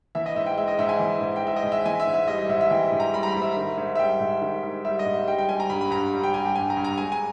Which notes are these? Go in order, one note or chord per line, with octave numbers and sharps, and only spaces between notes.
E3 E5
D#5
G#2 E5
G5
G#3 E5
D#5
G#2 E5
G#5
E3
G#2
G5
G#3 E5
D#5
G#2
E5
E3 G#5
E5
G#2
E5
G3 D#5
D#5
G#2 E5
E5
E3 G5
G#2
A#5
G3 B5
A#5
B5
G#2
E5
D#3
G#2
E5
G3 G5
G#2
D#3
G#2
G3 E5
D#5
G#2
G3 G5
G5
G3 G#5
A#5
G2 B5
B5
G2 A#5
G3
G5
G3 G#5
G5
G2 G#5
A#5
G2
A#5
G#3 G#5
G#5